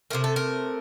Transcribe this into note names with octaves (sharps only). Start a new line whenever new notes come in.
C3 D#3 A3 A#4
A4
A#4